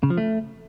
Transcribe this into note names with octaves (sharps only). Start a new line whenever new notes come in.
C#3
F3
A3